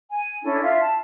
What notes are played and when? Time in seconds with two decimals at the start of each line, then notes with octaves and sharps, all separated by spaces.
0.11 G#5
0.43 C#4 D4 E4 A4
0.62 F4 E5 F5
0.80 A5